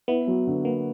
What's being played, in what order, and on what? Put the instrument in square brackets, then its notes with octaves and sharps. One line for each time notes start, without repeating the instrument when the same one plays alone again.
[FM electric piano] B3 [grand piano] E4
[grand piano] F#3
D3
[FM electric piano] A#3 [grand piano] B3